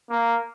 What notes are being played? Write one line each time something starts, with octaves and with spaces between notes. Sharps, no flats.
A#3